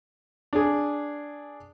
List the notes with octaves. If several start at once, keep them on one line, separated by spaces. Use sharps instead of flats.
D4 G#4